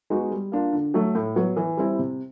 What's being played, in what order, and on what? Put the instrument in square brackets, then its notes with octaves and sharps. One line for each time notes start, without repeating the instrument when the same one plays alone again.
[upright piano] G#3 B3 D#4 F#4
G3
A#3 D4 F4
D3
F#3 A3
A2
F#3 B3
E3
G3 C4 E4
C3